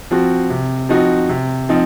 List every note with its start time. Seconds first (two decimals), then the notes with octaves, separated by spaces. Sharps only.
0.11 F3 C4 F#4
0.50 C3
0.89 F3 C4 D#4 F#4
1.29 C3
1.69 F3 C4 D#4